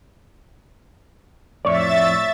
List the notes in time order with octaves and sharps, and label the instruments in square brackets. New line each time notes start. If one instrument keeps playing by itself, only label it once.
[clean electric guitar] F2 A2 C#5 [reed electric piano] D5 [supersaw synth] E5 A6